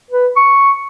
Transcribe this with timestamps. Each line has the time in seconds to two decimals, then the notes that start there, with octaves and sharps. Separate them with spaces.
0.11 B4
0.36 C#6